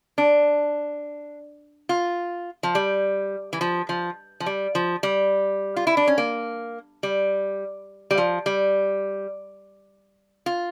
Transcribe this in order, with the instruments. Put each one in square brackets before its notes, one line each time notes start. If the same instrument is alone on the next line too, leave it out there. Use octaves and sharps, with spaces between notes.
[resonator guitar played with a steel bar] D4
F4
F3
G3
E3
F3
F3
F3
G3
F3
G3
F4
E4
D4
C#4
A#3
G3
G3
F3
G3
F4